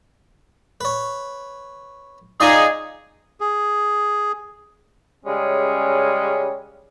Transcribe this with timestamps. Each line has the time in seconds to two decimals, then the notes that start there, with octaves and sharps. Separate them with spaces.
0.81 B4 C#5
2.40 D#4 F4 G#4 D5 G5
3.41 G#4
5.26 C#3 G3 G#3 C#4